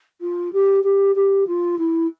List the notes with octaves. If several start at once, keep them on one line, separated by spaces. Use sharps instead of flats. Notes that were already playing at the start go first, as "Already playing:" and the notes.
F4
G4
G4
G4
F4
E4